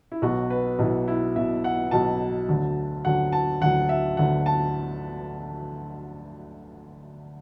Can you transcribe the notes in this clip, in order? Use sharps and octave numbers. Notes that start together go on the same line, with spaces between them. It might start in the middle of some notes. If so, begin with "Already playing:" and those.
E4
B1 B2 F#3 F#4
B4
B1 B2 F#3 E4
E4
B1 B2 F#3 E5
F#5
B1 B2 F#3 A5
D2 D3 F#3
D2 D3 F#3 F#5
A5
D2 D3 F#3 F#5
E5
D2 D3 F#3 F#5
A5